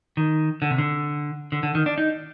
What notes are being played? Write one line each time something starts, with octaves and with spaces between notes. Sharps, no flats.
D#3
D3
C3
D3
D3
D3
D#3
D4
D#4